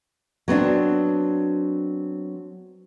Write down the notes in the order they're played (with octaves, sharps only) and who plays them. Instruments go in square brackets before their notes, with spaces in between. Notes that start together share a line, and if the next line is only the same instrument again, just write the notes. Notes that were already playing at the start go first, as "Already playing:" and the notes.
[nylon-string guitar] F#3 B3 C4 D4